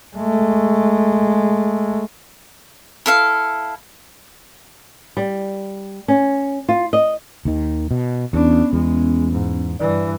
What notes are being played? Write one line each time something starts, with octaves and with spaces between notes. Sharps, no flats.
G#3 A3
E4 A4 F5
G3
C#4
F4
D#5
D#2 D#3
B2
E2 B3 C#4 D4
E2 G#3
G#2
G2 E3 G3 D5